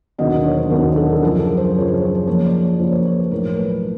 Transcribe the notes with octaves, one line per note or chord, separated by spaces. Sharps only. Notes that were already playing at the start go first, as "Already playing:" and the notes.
E1 D#2 D3 F#3 B3 D#5
C#5
C5
E1 D#2 D3 F#3 B3 A#4
A4
G#4
F#2 C#3 F3 A4
A#4
C5
F#2 C#3 F3 C#5
C#5
C5
C5
F2 C#3 F3 A#3 C#5
D5
C#5
F2 C#3 F3 A#3 C5
C#5
C5
C#5
B4
B1 A2 F3 A#4
B4